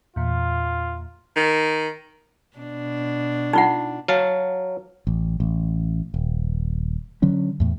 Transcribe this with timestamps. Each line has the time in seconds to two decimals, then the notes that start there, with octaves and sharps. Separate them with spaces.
0.16 E2 A#2 F4
1.36 D#3
2.57 B2 D4
3.53 D#4 F4 F#5
4.08 F#3 F5 A5
5.07 A1
5.40 A1
6.14 D#1
7.22 D3 F#3 C#4
7.60 E2 A2